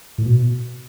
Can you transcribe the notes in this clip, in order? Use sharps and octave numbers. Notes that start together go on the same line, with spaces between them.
A2
B2